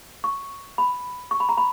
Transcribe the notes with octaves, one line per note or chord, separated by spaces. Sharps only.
C#6
B5
C#6
B5
A#5
B5